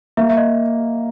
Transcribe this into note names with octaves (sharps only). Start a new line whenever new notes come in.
A#3 E5
E5
D#5